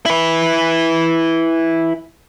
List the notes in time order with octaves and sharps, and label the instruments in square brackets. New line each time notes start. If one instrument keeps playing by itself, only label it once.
[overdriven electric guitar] E4 B4